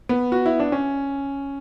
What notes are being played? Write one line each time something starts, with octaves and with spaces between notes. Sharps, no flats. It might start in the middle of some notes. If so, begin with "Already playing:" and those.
B3
F#4
E4
D4
C#4